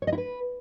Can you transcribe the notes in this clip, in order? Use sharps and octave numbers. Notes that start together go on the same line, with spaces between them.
C#5
D#5
E4
B4